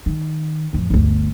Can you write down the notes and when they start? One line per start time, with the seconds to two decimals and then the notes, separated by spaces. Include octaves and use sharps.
0.06 D#3
0.73 A1 F2
0.90 G1 D2